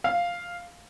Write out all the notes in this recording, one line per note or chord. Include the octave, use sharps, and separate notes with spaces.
F5